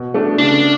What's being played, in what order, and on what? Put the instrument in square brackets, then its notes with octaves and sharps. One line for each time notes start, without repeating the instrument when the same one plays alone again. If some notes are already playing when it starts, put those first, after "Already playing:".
Already playing: [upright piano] B2
A3 D4
[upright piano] C#3 [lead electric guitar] D4